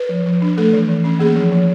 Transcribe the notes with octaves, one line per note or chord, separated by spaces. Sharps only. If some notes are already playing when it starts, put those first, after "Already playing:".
Already playing: B4
F3
F3
D4
A3 A4
E3
E3
C#4
A#3 G#4
F3
F3